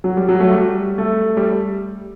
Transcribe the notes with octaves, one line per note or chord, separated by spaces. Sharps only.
F#3
G3
F#3
A3
G3
A3
G3